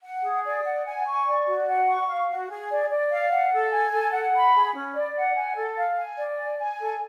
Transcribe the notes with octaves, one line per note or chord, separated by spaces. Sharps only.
F#5
G#4
D5
F#5
G#5
C#6
D5
F#4
F#5
C#6
F5
F#4
G#4
D5
D5
F5
F#5
A4
G#5
A4
F#5
B5
G#4
C#4
D5
F#5
G#5
A4
F5
G#5
D5
G#5
G#5
A4